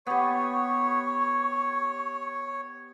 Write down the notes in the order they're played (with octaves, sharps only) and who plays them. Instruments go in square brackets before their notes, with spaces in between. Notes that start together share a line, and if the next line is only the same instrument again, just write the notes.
[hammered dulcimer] B3 G4 [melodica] C#5 [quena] C#6